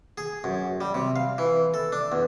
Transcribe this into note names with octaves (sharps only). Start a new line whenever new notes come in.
G#4
F#2
G3
C3
F5
E3
A4
D4
E2